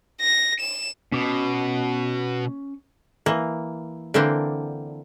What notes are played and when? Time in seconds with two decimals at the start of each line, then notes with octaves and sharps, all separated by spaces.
0.21 A#6
0.61 E7
1.12 B2 C#4 D6
3.26 E3 A#3
4.14 D3 E3 A#3 C4 D4